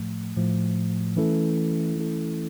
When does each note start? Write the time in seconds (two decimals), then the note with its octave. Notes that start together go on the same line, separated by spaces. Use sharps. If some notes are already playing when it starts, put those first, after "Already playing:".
Already playing: A2 F3 A3
0.36 A2 F3 A3
1.17 E3 A3 C#4 E4 A4
1.96 E3 A3 C#4 E4 A4